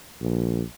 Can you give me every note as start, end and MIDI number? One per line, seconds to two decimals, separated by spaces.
0.22 0.61 34